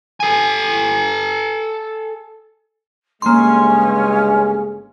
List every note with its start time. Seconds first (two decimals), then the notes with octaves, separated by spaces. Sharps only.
0.20 A4 G#5
3.22 G1 C#3 G#3 A#3 C#4 C6